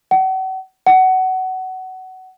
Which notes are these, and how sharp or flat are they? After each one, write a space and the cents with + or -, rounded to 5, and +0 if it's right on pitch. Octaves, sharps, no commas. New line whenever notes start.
F#5 +40
F#5 +20